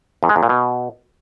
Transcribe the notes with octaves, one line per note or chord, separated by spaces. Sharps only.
E2
G#3
E2
A#2
B2